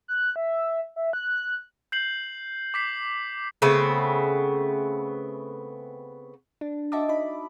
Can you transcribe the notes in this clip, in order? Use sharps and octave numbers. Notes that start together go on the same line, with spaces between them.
F#6
E5
E5
F#6
G6 C7 F#7
D6 B6 C7
C#3 A3 B3 C4
D4
F#4 D#5 E5 A5 D6
D#4 B5